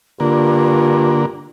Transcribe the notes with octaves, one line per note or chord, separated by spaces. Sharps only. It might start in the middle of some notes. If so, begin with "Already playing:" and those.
G2 D3 A#3 F4